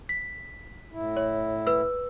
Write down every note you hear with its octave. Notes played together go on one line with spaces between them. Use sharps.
B6
A2 E4
C#5
B4 E6